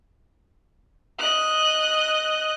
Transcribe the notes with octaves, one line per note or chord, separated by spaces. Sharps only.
D#5 F#6